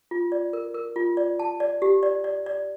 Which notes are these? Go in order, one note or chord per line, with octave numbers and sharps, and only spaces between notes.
F4
D5
A#4
A#4
F4
D5
A5
D5
G4
D5
D5
D5